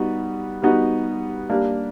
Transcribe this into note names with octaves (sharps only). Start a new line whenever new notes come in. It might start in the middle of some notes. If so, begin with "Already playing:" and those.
Already playing: G3 B3 D#4 F#4
G3 B3 D#4 F#4
G3 A#3 D4